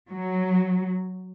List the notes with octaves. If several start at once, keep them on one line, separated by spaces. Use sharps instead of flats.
F#3